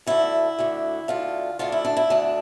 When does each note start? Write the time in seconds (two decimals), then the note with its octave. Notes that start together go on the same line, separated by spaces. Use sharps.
0.07 D2 D3 E4
0.59 D2 D3
1.08 D2 D3 F4
1.59 D2 D3 F4
1.72 E4
1.85 D4
1.97 E4
2.10 D2 D3 D4